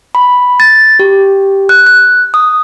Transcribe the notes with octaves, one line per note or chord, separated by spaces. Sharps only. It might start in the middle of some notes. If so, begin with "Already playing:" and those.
B5
A6
G4
F#6
F#6
D#6